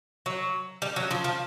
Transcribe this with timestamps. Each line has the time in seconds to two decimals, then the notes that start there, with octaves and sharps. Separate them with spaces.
0.26 F#3
0.82 G3
0.96 F#3
1.11 F3
1.24 F3